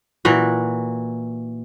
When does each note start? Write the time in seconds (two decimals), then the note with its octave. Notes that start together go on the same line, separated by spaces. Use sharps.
0.25 A#2 E3 F#4